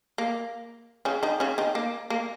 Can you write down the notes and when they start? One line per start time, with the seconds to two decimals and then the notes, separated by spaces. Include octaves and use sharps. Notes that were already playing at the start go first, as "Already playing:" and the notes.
0.18 A#3
1.05 C#3 C#4
1.23 D#3 D#4
1.40 C#3 C#4
1.58 D#3 D#4
1.75 A#3
2.10 A#3